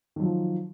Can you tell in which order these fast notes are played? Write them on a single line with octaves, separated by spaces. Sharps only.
D#3 F#3 F3